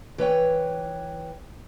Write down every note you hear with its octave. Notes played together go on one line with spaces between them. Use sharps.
E3 B4 C#5 G5